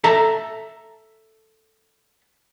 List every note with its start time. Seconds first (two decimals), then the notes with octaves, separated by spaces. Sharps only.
0.04 A4 E5 A5 A#5